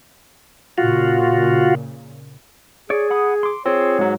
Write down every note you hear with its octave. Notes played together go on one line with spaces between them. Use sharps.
A#2 C#3 F4 F#4
G#4 C#5 D5
F#5 B5 D#6
C6 D6
C4 F4 G#4 C#5
G#2 F#3